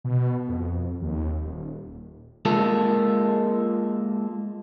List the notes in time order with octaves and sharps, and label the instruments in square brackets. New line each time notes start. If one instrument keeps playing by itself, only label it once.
[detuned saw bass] B2
F2
D#2
D#1
[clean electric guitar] G#3 A#3 F4 A4